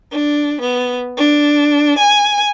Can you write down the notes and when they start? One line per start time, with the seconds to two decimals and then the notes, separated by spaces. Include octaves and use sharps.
0.12 D4
0.61 B3
1.17 D4
1.97 G#5